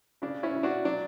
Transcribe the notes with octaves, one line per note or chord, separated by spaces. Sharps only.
C#3 D4
C#4 E4
C#3
D4 F#4
F#3 D4